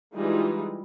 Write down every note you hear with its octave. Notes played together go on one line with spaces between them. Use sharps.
E3 G3 G#3 D#4 F4 G#4